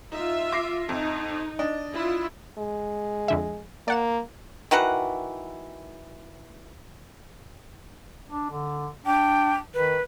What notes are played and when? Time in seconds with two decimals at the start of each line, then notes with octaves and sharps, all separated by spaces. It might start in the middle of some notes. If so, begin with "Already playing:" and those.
0.12 D#4 F4 E5
0.52 D6 A#6 C7
0.89 F2 D#4
1.59 D4 D#5
1.92 E4 F4
2.58 G#3
3.28 F2 D3 E5
3.88 A#3 D5 F#5 E7
4.71 D#3 E3 F#4 F#5
8.30 D4
8.50 D3
9.06 D4 G5
9.74 D#3 B4